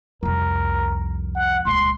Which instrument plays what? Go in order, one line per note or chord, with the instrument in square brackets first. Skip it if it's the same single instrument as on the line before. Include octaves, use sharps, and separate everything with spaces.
[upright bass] C2 F2 [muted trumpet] A#4
[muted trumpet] F#5
[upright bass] D#1 C#2 [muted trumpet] C6